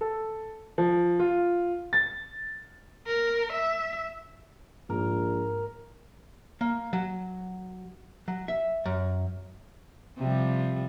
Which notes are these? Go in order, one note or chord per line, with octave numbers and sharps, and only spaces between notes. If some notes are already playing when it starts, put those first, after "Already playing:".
A4
F3
F4
A6
A#4
E5
A#1 G#2 A#4
A#3
F#3
F#3
E5
F#2
C3 F3 G3